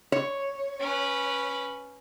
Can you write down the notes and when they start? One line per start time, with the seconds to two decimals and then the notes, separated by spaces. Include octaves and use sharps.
0.12 C#5
0.80 C#4 B4